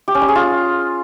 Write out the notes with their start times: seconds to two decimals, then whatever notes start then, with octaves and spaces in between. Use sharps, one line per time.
0.08 G4
0.15 C#4
0.22 G3
0.28 G#4
0.35 F4